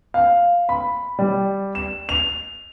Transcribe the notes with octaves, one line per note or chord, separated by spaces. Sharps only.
F5
B5
G3
E7
F7